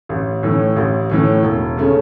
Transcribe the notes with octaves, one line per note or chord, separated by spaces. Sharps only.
A1
A2 E3 C#4
A1
A2 E3 C#4
E1
C#3 A3 C#4